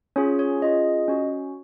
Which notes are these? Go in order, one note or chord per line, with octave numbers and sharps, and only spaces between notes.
C#4 F4 G#4 C#5
C#5
C#4 F4 G#4 D#5
C#4 F#4